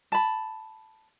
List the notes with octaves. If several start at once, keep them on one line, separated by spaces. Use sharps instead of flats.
A5 B5